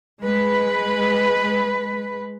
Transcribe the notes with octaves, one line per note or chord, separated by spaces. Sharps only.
G#3 B4